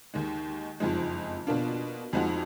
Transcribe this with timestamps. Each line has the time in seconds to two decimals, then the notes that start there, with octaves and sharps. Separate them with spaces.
0.14 D#2 D#3 G#3 D#4
0.80 F#1 F2 F3 G#3 D#4
1.47 B2 A#3 D4 F4
2.13 F2 F3 G#3 D#4 F#4